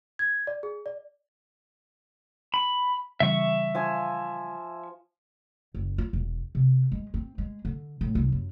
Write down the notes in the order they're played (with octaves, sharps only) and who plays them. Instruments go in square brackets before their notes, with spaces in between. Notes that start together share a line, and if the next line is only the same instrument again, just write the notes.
[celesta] G#6
D5
G#4
D5
[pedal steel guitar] B5
[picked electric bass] C#3 E3 G3 [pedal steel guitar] E5 C#6
[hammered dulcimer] F3 G#5
[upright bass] F#1
F4
E1
C3
G#3
C4
G#3
D3
A2
C2
F#2